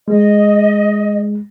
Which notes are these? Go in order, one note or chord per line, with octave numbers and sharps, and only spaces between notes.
G#3 D#5